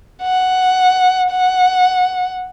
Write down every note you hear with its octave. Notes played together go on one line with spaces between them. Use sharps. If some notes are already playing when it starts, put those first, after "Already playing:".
F#5
F#5